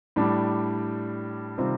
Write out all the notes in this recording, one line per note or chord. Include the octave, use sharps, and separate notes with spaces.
A2 G3 D4
C3 D#3 G3 C4 F4